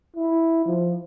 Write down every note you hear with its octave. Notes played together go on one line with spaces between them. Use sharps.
E4
F3